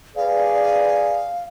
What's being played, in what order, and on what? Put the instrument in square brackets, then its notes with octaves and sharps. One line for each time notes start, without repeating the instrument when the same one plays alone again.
[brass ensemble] G#4 B4 D5 [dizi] F5